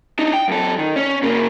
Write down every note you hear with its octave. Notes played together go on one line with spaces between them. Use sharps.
D4 D#4
G5
F#2 A4
D#3
C#4
C#3 A#3